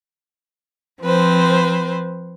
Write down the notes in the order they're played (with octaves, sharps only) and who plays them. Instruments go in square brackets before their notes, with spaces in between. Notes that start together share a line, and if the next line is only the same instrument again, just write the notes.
[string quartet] F3 C4 B4 C5